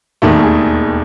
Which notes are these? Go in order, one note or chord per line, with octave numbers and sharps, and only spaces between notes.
E1 D#2 D#3 A3
G#4